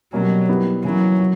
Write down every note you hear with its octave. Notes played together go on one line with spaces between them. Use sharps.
B2 F#3 G3 A#3 C#4
G3 B3 E4 G4
C#3 E3 F#3 A#3 C#4 E4
F#3